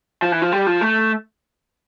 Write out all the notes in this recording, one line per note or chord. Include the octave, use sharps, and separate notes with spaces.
F3
E3
F3
G3
F3
A3